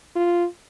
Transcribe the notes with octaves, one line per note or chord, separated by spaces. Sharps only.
F4